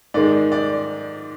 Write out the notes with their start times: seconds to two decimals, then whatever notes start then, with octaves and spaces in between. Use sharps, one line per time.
0.14 G#2 D#3 G#3 D5
0.52 D5